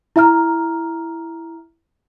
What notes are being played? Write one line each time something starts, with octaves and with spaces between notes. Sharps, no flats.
E4 E5 A#5 F6